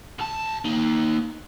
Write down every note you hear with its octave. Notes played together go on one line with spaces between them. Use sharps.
B1 A5
A#3 D#4